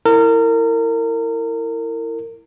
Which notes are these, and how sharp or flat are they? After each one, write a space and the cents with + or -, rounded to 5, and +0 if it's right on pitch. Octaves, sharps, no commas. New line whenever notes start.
E4 +0 A#4 -30